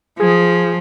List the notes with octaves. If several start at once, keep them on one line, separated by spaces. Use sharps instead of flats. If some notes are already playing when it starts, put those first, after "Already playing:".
F3 G#4